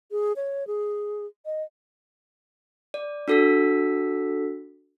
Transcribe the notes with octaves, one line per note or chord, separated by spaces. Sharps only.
G#4
C#5
G#4
D#5
D5
D4 F#4 A4 E6 B6